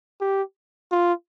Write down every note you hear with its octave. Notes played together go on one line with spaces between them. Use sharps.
G4
F4